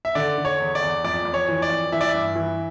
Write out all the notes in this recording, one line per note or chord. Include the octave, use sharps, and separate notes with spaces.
E5
D3 D5
D3
C#5
E2
D5
E2
F2 D5
F2
C#5
E3
D5
F2
E3 E5
D5
E5
G2
E3